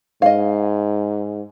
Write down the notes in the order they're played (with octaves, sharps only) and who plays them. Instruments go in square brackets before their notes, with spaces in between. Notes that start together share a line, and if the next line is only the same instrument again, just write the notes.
[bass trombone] G#2 [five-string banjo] D#5 F5